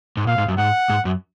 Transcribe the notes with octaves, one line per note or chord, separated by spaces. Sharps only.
G#2
A#2 F5
G#2
F#2
G#2 F#5
G#2
F#2